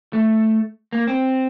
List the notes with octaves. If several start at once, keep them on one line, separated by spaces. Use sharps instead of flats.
A3
A#3
C4